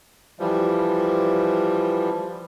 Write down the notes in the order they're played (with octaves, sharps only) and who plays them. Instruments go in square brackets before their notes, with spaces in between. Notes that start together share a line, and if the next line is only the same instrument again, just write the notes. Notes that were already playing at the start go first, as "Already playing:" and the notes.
[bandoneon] E3 F3 G3